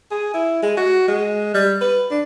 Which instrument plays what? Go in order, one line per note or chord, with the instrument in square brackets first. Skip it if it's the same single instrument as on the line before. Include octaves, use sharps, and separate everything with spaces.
[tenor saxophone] G#4
E4
G#3
F#4
G#3
G3
B4
D4